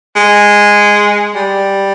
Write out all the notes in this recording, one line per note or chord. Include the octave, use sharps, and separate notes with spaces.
G#3
G3